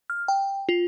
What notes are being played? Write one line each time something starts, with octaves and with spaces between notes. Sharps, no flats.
F6
G5
F4